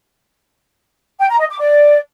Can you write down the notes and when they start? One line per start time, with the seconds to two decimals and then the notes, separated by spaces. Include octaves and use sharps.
1.19 G5
1.29 A#5
1.39 D#5
1.48 D6
1.58 D5